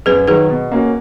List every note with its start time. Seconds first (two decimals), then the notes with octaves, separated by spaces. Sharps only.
0.06 F#2 G#4 B4
0.28 D#3 F#3 G#4 B4
0.50 B2
0.72 A#3 C#4 F#4